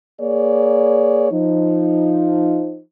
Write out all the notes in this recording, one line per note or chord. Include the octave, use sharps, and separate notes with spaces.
A#3 G#4 C#5 D5
F3 D#4